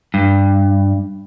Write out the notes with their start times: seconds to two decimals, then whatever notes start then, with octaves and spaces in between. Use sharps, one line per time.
0.14 G2